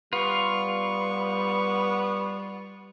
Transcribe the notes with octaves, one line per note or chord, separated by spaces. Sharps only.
G3 B3 F4 C#6